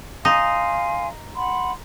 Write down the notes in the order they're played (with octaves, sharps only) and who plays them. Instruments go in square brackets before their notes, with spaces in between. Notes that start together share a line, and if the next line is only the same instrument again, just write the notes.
[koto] D#4 [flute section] F5 G#5 C6
[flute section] F#5 B5 C6